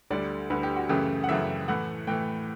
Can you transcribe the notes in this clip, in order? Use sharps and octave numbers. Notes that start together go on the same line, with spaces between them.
D2 D3 G3 D5
D2 D3 G3 B4
G4
F#4
F#2 C#3 E3 A3 G4
F#5
F#2 C#3 E3 A3 E5
A2 E3 A3 F#5
A2 E3 A3 G5